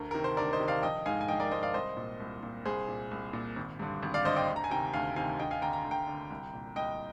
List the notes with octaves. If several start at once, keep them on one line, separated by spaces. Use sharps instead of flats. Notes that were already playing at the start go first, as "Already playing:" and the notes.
Already playing: D2 A#4
C3 D#3 A#4
C5
D2 A#4 D5
C5 D#5
C3 D#3
D5 F5
A#1 D#5 G5
G#2 D#3 F5 G#5
G#5
A#1 D#5 G5
A#4 D5
G#2 D#3 C5 D#5
D5 F5
C2 C5 D#5
A#2
C2
A#2
C2 G#4 C5
A#2
C2
A#2
G#1
G2 D3
G#1
D5 F5
G2 D3 C5 D#5
D#5 G5
D2
A#5
G#5
C3 D#3 G5 A#5
D2 F5 G#5
C3 D#3 F5 G#5
D2 D#5 G5
F5 G#5
D3 G5 A#5
A#5
D2
G5 A#5
D3
C2
A#2
C2 D#5 G5